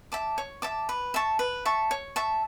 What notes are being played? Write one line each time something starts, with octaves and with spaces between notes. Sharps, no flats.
E5 A5 D6
C#5
E5 A5 D6
B4
E5 A5 C#6
B4
E5 A5 C#6
C#5
E5 A5 C#6